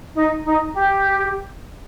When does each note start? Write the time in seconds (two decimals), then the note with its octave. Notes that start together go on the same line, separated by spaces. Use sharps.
0.15 D#4
0.45 D#4
0.74 G4